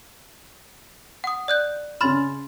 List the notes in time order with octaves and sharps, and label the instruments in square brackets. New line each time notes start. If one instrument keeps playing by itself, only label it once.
[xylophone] F#5 D#6
D5 F#6 G6
[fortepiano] C#3 C#4 F6 [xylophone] B5 C6 A6